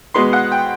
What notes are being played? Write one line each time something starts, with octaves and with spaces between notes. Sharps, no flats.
B2 G#3 B3 C6
F#5
G5